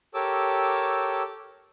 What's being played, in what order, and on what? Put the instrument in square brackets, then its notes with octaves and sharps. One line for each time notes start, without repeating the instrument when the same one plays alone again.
[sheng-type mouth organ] G4 A4 A#4 C#5 D6 E6